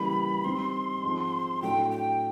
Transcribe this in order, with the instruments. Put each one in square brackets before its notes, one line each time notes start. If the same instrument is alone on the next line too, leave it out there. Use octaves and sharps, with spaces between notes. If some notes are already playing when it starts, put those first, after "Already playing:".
Already playing: [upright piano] C#3 E3 G3 A#3 [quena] B5
[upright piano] D#3 G3 C4 [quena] C6
[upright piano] G#2 F3 G#3 C4
[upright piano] A2 F#3 A3 D4 [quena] G5
[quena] G5